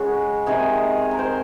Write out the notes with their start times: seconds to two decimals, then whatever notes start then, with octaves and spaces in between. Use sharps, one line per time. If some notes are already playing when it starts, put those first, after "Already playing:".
Already playing: C#3 G#3 F#4
0.46 C3 D#3 G#3 G#4
1.11 A#4
1.19 C5